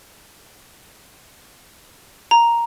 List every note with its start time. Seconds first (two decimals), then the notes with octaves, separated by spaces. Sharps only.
2.31 A#5